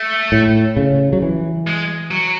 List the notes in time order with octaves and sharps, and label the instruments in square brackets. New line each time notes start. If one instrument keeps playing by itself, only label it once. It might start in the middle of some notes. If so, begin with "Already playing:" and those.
Already playing: [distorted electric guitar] A3
[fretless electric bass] A2
C#3
F#3
E3
[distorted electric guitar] G#3
F#3